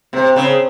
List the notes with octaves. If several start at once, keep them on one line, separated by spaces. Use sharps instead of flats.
C3 C4
C#3 C4